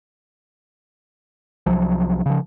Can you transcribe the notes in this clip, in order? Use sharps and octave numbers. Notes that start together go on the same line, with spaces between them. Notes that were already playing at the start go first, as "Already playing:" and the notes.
C2 F3 F#3
C#3 F3